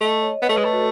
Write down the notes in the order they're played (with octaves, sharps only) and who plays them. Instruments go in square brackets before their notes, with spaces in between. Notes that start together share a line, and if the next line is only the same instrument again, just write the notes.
[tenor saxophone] A3 [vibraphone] D#5
[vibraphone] C#5
[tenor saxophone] B3 [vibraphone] D#5
[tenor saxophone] A3 [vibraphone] B4
[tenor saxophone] G#3
[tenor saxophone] A3 [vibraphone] A4
[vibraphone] F#4